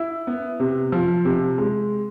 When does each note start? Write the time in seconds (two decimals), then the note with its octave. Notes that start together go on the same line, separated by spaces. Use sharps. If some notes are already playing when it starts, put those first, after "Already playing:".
Already playing: E4
0.27 B3
0.60 C3
0.92 F3
1.25 C3
1.58 G#3